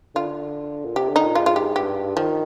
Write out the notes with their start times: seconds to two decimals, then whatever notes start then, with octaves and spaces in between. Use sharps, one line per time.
0.15 D3 F4
0.85 A#2
0.95 C3 G4
1.09 D3
1.16 D#4
1.23 A#2
1.35 G#2 F4
1.46 F4
1.56 G4
1.76 G2 G4
2.16 D#3 F3